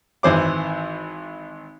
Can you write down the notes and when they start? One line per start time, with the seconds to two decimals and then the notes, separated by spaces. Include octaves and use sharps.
0.23 G#1 E3 C5 D6